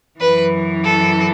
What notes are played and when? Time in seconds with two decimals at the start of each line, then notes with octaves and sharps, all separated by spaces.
0.20 F#2 E3 B4
0.85 A4